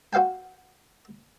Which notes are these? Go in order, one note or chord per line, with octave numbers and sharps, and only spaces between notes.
F#4 C5 F5 G5 G#5